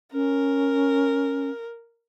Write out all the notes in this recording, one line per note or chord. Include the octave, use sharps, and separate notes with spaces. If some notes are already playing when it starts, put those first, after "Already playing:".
C#4 A#4